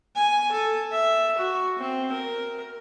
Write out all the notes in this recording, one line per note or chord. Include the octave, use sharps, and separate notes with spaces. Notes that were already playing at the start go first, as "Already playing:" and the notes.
G#5
A4
E5
F#4
C4
A#4